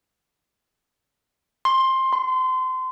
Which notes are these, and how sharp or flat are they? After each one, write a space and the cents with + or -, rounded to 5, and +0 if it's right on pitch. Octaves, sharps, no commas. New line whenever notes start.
C6 +15
C6 -25